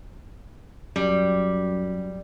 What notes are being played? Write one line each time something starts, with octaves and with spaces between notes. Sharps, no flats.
F#2 G3